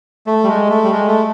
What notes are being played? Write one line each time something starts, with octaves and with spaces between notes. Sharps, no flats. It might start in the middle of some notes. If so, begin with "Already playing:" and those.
A3
G3
G#3
A3
G3
G#3
A3